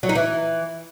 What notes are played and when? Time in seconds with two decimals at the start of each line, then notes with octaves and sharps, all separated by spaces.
0.03 F#3
0.09 D#4
0.15 E3